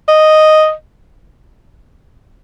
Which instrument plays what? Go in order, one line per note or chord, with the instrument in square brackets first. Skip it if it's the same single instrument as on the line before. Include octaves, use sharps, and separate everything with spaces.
[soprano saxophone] D#5